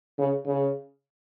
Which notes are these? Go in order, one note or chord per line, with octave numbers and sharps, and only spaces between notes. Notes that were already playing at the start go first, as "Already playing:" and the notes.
C#3
C#3